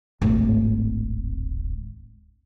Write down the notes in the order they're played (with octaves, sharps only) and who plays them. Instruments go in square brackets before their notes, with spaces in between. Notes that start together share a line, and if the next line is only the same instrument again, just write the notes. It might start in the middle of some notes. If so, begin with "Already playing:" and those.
[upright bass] D1 G#1